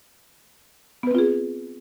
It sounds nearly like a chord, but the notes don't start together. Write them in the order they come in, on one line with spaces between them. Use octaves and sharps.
B3 B4 C4 F4 G#4